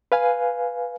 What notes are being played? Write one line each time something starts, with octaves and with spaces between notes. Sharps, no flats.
B4 F5 G#5